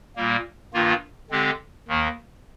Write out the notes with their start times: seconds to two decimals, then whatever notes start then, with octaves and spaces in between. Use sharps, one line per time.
0.16 A#2 G3 A#3
0.74 G2 D#3 A#3 F4
1.30 D3 G#3 C4 G4
1.88 D#2 D#3 A#3